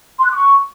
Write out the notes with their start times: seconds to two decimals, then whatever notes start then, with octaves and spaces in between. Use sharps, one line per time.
0.19 C6
0.25 F#6
0.30 D6
0.36 C#6